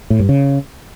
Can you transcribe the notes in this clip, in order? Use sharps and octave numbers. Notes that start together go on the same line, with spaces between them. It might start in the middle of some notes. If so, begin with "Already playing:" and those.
A2
G2
C#3